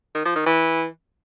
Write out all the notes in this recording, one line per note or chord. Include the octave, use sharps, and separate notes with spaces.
D#3
F3
D#3
E3